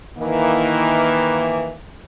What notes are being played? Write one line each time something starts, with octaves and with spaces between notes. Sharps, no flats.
D#3 E3 A#3